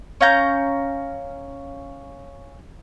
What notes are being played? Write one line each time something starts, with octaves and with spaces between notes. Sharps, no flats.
C#4 F5 A#5 G6